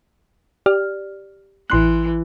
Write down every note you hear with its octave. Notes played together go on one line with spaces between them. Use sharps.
G4 D5 F6
A1 E3 C6 F#6